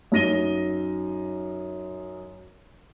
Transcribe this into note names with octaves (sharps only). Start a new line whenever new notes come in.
F#2 D#4 A#6 D#7 G7